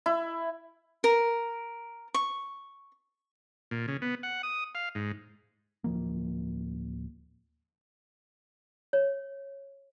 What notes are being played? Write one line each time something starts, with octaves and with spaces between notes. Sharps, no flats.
E4
A#4
C#6
A#2
C#3
B3
F#5
D#6
F5
G#2
D1 F3 A#3
C#5